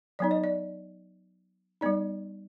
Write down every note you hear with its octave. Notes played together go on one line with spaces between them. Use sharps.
F#3 B3 D#4 D5
D#5
D5
G3 B3 D#4 D5